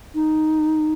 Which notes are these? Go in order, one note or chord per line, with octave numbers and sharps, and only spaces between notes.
D#4